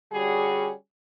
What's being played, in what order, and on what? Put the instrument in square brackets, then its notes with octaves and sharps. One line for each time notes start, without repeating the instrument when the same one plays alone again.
[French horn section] D3 G3 C#4 F#4 G#4